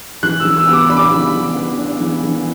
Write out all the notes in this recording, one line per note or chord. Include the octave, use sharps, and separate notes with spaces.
E3 F#6
E6
E3
E6
B3
D6
D4 B5
D6
B5
E3
E3
B3
D4
E3
E3